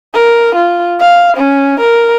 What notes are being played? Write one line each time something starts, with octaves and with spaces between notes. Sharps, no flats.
A#4
F4
F5
C#4
A#4